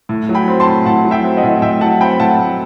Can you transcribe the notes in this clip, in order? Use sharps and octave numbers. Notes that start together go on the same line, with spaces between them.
A2
F#3
G5 B5
C4
A5 C6
A2
A2 F#5 A5
F#3
E5 G5
C4
D#5 F#5
A2
A2 E5 G5
F#3 F#5 A5
C4 G5 B5
A2 F#5 A5
A2